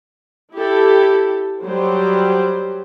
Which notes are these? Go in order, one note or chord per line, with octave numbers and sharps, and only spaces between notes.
E4 G4 A4
F#3 G3 C5